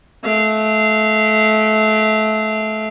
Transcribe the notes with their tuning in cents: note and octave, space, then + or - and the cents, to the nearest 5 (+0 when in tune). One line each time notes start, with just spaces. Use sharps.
A3 -25 F5 -20